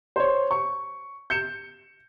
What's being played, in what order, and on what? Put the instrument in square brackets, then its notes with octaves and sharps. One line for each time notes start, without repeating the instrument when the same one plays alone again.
[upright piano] C5 C#5
C#6
G6 C#7 E7